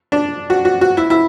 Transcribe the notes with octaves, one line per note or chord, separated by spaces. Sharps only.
D4
F#4
F#4
F#4
E4
E4